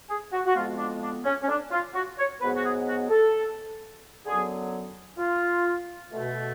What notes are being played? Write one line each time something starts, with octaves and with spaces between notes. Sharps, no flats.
G#4
F#4
F#4
F2 F3 G#3 B3 F4
D4
D4
C#4
C#4
D4
F4
F#4
C#5
G#2 F#3 B3 B4
F#4
G#4
F#4
A4
F#2 D3 F#3 B3 G#4
F4
B2 A3